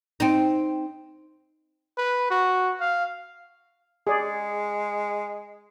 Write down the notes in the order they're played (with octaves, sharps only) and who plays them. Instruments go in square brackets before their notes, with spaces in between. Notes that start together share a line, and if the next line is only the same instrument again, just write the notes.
[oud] C4 D#4
[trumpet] B4
F#4
F5
[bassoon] G#3 [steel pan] G#4 D5